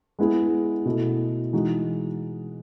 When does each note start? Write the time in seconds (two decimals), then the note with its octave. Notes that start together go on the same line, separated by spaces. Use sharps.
0.19 G#3 B3 E4 G#4
0.85 B2 A3 E4
1.53 E3 G#3 D#4 F#4